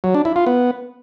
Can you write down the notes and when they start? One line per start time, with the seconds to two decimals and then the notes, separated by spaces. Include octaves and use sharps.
0.04 F#3
0.14 D4
0.25 E4
0.36 F4
0.46 B3